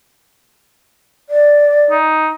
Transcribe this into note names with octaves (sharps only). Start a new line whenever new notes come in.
D5
D#4